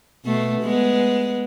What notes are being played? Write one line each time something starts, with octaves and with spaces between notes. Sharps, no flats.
B2 A3
G#3 B3